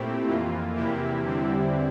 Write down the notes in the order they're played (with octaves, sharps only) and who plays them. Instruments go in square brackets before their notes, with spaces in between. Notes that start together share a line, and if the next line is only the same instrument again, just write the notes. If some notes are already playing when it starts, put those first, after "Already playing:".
Already playing: [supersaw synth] A#2 A3 C4 E4 G4
F2 E3 A#3 F4
E2 C3 E3 A#3 E4 G4
E2 D3 G3 C4